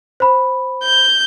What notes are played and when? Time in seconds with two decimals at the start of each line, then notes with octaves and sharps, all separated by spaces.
0.20 C5 B5
0.83 G6